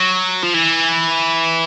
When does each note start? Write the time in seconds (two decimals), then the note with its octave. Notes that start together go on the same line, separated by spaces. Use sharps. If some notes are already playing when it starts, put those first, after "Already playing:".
Already playing: F#3
0.43 F3
0.54 E3